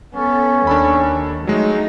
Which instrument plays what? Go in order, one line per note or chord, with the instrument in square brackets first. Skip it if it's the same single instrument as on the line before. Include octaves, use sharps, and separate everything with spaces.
[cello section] B3 A4 [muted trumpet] C#4
[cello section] D#2 [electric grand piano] D4 A4 B5
[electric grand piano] F#3 G#3 [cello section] A3 D#4